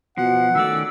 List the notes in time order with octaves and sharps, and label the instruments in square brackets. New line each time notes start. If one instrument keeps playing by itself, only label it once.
[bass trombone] B2 [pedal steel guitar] F3 [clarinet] F#5
[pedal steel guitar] D#3 C#4 D5 [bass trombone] A3 [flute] E6